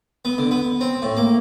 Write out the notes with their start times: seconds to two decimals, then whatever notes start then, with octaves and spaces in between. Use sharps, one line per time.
0.25 B3
0.38 D3
0.51 B3
0.81 C4
1.02 A2
1.17 A#3